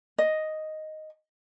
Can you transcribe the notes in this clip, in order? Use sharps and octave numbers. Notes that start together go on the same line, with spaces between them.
D#5